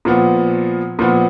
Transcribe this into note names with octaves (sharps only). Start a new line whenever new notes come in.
A#2 F3 B3
A#2 F3 B3